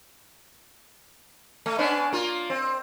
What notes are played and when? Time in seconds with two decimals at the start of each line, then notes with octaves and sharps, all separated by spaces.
1.66 A3
1.78 B3 C#4 D4
2.12 A#3 F4
2.50 C4